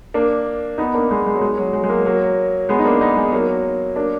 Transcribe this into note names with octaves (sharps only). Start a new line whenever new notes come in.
A#3 D4
B3 D#4
A#3 D4
G#3 B3
G#3
F#3
G#3
F#3
G#3
G#3
F#3 A#3
F#3 A#3
G#3 B3
D#4
A#3 D4
B3 D#4
G#3
F#3 A#3
A#3 D4